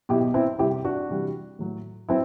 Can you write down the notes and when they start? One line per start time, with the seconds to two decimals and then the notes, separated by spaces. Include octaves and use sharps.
0.09 B2 F#3 E4 G4
0.34 C4 E4
0.59 C3 G3 E4 G4
0.84 D4 F#4
1.10 C3 E3 G3
1.59 A2 F#3
2.09 F#3 C4 E4